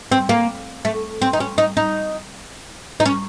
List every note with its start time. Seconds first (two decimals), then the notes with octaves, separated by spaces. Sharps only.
0.12 C4
0.29 A#3
0.85 A3
1.22 C4
1.33 D#4
1.40 C#4
1.58 D#4
1.77 D#4
3.00 D#4
3.06 C#4